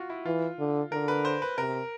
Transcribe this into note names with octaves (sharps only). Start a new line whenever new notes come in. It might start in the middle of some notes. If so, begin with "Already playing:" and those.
Already playing: F4 F#4
E4
E3 F4
D3
D3 A#4
B4
C5
B4
C3 A#4